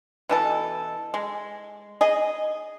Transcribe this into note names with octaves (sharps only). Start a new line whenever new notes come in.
B2 E3 A4
G#3
G#4 D#5